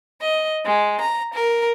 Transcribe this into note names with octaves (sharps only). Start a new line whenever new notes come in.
D#5
G#3
A#5
A#4